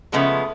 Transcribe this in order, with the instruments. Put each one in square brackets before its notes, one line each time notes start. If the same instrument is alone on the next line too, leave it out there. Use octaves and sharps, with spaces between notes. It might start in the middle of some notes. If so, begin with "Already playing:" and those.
[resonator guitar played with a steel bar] C#3 F3 G#3 B3 [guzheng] A3